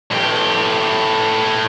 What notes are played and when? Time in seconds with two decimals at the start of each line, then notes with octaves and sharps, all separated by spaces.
0.11 A2 G4